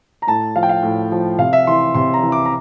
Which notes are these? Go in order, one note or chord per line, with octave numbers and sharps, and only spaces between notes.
A#5
A2 A5
F3 F5
G5
F5
A2
F3
C3 F5
E5
E3 C6
C3 C6
A#5
E3
D6
A#5